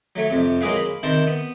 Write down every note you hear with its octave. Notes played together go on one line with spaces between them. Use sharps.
F#3 A3 C#5
F2 C3
F#3 G#3 A#3 G#4 B4 F5
B5
C3 D#3 C5 A5 C#6
B3